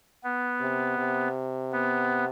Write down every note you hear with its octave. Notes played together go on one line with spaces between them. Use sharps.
B3
C3
C3
B3